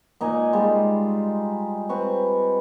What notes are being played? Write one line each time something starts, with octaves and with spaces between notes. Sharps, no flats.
A#2 D#4 D#5 G#5
G3 G#3 F4
C4 B4 C#6